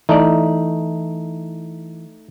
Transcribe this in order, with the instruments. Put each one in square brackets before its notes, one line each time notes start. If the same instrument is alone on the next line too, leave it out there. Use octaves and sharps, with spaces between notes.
[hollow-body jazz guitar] E3 D5 [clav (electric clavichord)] A3 D#4